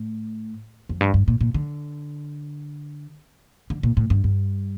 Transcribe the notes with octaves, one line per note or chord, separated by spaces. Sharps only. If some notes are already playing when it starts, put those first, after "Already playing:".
Already playing: A2
F2
G2
G2
A#2
A#2
D3
D3
A#2
A2
G2
G2